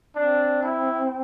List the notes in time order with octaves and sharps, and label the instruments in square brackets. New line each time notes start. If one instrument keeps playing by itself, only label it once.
[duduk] C4 [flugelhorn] D4
[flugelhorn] E4